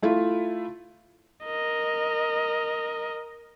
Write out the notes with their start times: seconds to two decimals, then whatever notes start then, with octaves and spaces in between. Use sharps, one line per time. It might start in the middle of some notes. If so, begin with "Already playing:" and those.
0.02 A3 E4 F4
1.45 A#4 D#5